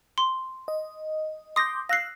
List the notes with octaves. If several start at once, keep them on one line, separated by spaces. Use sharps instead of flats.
C6
D#5
C6 D6 D#6 G6 A#6
F5 E6 F#6 A#6 C7